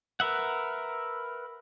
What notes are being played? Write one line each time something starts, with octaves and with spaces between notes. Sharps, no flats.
A#4 B4 E5 F#5